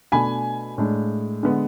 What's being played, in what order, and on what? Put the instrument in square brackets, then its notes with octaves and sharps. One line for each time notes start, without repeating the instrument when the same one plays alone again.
[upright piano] B2 A3 D4 G#5 B5
A2 G#3 D4
D3 G#3 B3